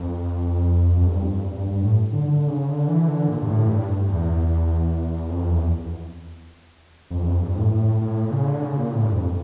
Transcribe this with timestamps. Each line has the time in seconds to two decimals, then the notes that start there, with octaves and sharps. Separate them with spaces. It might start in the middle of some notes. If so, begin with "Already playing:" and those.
Already playing: F2
0.97 F2
1.07 G2
1.22 F2
1.37 G2
1.52 G2
1.67 G2
1.82 A2
2.13 D3
2.28 D3
2.48 C#3
2.68 D3
2.88 E3
3.08 D3
3.28 A#2
3.42 G2
3.48 A2
3.68 G2
4.09 E2
5.29 F2
5.50 E2
7.10 F2
7.22 E2
7.26 F2
7.40 G2
7.56 A2
7.71 A2
8.01 A2
8.24 A#2
8.32 C#3
8.47 D3
8.62 C#3
8.77 A#2
8.92 A2
9.04 G2
9.12 F2